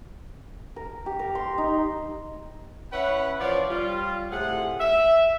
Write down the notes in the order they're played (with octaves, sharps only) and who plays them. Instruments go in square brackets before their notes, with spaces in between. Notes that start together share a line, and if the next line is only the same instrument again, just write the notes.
[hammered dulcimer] A#4
G4
A#4
C6
D#4
[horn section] C#4 E4 B4 C#5 F#5
E3 F3 F4 C#5 D5
G3 F4
A2 C3 G#4 F#5
E5